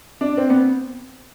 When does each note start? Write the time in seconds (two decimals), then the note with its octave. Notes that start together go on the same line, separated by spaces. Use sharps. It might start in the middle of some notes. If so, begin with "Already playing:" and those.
0.21 D4
0.37 C4
0.50 B3